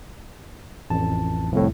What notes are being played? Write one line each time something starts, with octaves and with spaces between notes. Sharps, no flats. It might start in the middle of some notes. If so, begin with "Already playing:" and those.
A1 F2 A5
C2 F2 A2